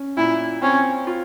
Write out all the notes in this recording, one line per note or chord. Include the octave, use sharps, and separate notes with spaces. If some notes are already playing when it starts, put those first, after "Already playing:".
Already playing: C#4
A#2 E4
C4 C#4
F4